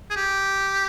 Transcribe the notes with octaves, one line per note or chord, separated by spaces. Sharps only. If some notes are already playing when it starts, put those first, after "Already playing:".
G#4
G4